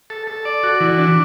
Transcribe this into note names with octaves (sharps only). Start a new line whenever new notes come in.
A4
A4
D5
F#4
E3
D4